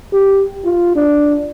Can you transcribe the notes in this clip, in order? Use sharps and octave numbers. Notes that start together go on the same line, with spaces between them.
G4
F4
D4